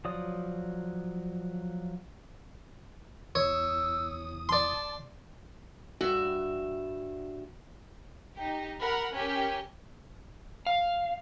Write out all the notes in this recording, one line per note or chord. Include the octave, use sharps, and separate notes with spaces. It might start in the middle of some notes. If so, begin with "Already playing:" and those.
F3 F#3 D5 D#6
E2 C#5 D#6 E6
D5 A5 C6
G2 F#4 E5
D#4 G4
A#4 F#5 B5
C#4 G4 A#4
F5